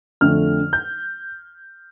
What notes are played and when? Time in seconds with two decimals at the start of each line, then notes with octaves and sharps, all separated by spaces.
0.21 F2 D3 A3 F6
0.73 G6